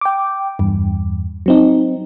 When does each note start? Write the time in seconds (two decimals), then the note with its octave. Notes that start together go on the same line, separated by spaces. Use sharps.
0.01 G5 D6
0.59 E2 G2
1.46 F#3 C4 D#4